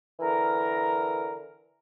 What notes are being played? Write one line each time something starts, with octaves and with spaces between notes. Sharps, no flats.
D3 E3 A#4